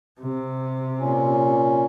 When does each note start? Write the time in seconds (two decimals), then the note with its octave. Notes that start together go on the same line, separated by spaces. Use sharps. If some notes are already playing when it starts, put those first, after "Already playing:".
0.21 C3
1.00 A#2 C#4